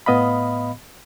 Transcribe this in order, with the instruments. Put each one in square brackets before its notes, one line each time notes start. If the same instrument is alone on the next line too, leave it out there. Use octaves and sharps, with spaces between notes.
[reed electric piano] A2 B3 D#5 F5 B5